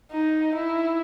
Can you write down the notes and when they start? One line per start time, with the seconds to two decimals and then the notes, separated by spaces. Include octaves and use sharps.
0.12 D#4
0.55 E4